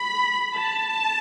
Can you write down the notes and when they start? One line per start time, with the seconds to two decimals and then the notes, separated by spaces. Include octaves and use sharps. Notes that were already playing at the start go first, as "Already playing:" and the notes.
Already playing: B5
0.58 A5